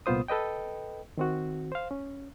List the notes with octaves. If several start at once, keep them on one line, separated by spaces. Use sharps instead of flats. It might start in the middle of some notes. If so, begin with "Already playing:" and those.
C2 A#2 B3 F4 C5 D#6
A4 B4 D#5 G5
D#3 C4 F#4
C5 F5
C#4